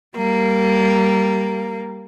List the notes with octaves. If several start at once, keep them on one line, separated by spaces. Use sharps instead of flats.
G3 A#3